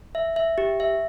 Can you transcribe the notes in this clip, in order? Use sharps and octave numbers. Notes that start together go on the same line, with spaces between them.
E5
E5
G4
E5